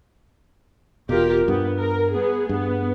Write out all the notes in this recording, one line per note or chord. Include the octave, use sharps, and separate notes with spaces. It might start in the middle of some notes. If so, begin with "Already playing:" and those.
E1 B2 F4 G4 A#4
G2 B3
A#4
B3 G#4
G2 B3